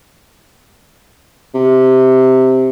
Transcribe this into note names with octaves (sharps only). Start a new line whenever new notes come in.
C3